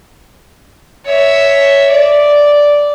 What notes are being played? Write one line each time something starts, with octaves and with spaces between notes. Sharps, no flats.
C#5 E5
D5